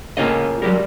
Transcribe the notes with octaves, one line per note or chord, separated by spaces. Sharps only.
A2 C#3 A#3 F4 C#5 D#5
F#3 G3 G4 A#4